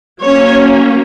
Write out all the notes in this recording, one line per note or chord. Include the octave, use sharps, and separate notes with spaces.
F#3 A#3 C#4 C#5